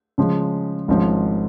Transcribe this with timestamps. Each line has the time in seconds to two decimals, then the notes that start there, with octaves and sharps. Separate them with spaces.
0.18 C#3 F3 G#3
0.88 G#1 G#2 F3 C#4